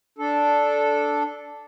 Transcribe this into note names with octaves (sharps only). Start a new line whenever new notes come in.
D4 A4